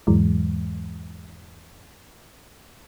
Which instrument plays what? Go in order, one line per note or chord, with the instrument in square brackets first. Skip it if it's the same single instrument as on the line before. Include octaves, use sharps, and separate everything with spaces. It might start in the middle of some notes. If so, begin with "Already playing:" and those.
[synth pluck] E2 G#2 E3 F#3 G#3